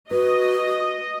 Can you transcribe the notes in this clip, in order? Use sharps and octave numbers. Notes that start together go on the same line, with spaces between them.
F#4 B4 D#5